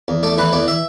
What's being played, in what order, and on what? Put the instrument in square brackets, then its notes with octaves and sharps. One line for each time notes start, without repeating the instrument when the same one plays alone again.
[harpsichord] E2
A3 D5
E3 B4
E2 D5
E5